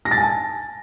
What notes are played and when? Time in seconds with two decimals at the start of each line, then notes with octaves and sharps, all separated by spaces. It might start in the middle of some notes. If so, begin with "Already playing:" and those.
0.05 A#6
0.11 A6
0.17 G#5
0.23 A5